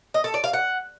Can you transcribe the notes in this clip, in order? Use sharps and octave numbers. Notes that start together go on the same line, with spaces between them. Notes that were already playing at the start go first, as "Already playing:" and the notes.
D#5
A4
D5
F5
F#5